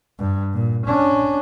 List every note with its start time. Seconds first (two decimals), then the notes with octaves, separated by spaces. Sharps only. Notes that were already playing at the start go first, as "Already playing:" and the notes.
0.19 G2
0.54 A#2
0.87 C#4 D4